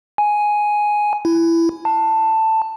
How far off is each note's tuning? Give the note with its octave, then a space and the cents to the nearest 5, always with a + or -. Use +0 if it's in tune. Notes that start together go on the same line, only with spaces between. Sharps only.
G#5 +5
E4 +15
A5 +10